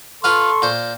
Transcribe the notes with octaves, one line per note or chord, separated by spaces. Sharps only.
F4 A4 B4 F5 C6 C#6
A#2 C5